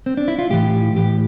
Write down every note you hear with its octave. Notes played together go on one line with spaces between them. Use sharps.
C4
D4
E4
F4
A2 E3 G4
A2 E3 G4